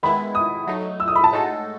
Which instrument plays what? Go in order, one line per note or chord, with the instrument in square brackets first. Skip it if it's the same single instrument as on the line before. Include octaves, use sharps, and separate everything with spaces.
[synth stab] D#3 G#3 B3 E4 [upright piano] B5
[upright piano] D#6
[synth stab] F#3 A3 D#4
[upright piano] E6
D#6
B5
A5
[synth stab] A2 G#3 D#4 F#4 A4